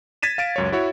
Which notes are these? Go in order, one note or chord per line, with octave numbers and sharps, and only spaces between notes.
G#6 A6 B6 D#7 E7
F5 A6 D7
C#2 F#2 C#5
E4 F#4 C#5 E5